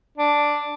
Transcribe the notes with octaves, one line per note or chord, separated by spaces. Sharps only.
D4